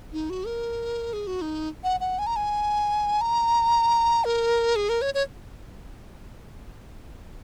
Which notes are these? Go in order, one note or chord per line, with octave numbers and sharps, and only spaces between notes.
D#4
F#4
A#4
G#4
F#4
D#4
F#5
F#5
G#5
A#5
G#5
A#5
A#4
G#4
A#4
C#5
C#5